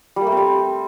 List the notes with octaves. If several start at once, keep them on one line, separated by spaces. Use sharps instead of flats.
G3
A#3
A3
C4
G3